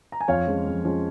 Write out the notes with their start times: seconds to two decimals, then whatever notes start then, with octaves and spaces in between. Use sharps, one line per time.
0.12 A#5
0.21 G#5
0.28 F2 C#5 F5
0.47 F3 G#3 C#4
0.66 F2
0.85 F3 G#3 C#4